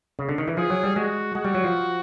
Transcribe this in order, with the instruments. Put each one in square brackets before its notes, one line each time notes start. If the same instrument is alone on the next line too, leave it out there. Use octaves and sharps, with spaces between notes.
[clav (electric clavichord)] C#3
D3
D#3
E3
[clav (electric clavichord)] F3 [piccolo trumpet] G#4
[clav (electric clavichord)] F#3
G3
[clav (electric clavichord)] G#3 [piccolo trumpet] F#4
[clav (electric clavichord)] G#3 [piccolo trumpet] F#4
[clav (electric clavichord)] G3
F#3
F3